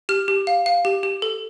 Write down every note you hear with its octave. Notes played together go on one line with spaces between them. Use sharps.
G4 F6
G4
F5
F5
G4
G4
A4